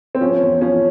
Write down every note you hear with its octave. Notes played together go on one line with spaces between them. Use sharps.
C4
F3 C#4
E2
F3 C#4